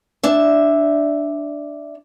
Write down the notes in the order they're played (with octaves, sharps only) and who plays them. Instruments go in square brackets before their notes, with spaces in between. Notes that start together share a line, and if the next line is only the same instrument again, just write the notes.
[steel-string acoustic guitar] D4 E5